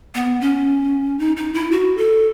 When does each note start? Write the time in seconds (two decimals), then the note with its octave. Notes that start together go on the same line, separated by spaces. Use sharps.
0.15 B3
0.41 C#4
1.19 D#4
1.37 D#4
1.54 E4
1.72 F#4
1.97 A4